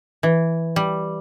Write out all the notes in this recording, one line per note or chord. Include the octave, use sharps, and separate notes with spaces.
E3
G3